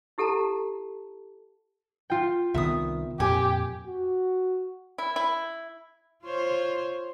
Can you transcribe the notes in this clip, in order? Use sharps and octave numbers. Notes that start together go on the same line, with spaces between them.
E4 G4 A4 F#5 A5 A#5
F4 G5
C2 D#3 B3 E5 D#6
F2 A#2 G4 G#5
F#4
E4
E4
F4 C5 C#5